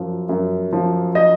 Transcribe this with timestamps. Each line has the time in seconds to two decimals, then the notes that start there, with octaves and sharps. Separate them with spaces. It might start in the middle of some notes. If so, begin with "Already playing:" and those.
Already playing: F#2 F3
0.29 F#2
0.73 F3
1.15 D#5